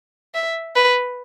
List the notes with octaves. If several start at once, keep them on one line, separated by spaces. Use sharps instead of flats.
E5
B4